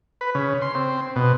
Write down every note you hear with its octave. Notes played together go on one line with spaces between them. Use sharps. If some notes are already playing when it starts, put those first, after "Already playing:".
B4
C#3
C6
C4
B2